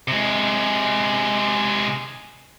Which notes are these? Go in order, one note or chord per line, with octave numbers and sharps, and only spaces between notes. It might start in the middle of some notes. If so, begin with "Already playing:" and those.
C3 G#3